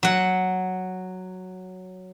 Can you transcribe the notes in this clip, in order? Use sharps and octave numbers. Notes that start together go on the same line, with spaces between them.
F#3 F#5